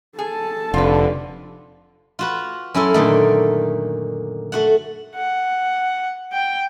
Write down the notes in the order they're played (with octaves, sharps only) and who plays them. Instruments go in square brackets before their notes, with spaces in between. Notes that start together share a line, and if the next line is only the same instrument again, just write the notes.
[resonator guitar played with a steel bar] G#4 [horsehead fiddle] A4 A5
[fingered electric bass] F1 [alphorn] D3 [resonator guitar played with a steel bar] F4 B4
[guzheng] F4 F#4 B4
F#2 C#4 E4 A4 C6
A#2 D3 D#3 A3
A3 F#4 F#5
[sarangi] F#5
G5